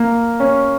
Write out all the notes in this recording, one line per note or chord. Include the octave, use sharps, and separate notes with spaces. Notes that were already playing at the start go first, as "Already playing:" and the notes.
Already playing: A#3
C#4